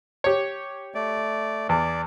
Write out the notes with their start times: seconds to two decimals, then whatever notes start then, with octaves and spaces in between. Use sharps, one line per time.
0.24 G4 C#5
0.95 A3 D5
1.69 E2 D5